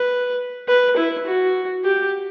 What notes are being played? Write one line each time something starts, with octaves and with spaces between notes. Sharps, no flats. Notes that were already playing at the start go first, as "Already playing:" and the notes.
Already playing: B4
B4
E4
F#4
G4